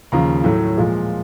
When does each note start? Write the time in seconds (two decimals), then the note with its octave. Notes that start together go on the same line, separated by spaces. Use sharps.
0.12 D#2 C#3 F3 A#5
0.44 A2 F#3 A3
0.77 A#2 F3 G#3